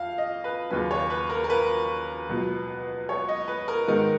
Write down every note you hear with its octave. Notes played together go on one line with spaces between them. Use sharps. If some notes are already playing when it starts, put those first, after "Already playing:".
Already playing: F2 F5
D#5
B4
D#2 C#3 F#3 C#4 F4 B4
C#5
B4
A#4
A#4
B4
C#2 B2 F#3
C#5
D#5
B4
A#4
G#2 D#3 G#3 B3 D#4 A#4